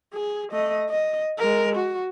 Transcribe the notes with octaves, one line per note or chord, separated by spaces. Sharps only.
G#4
A3 D#5
D#5
G#3 A#4
F#4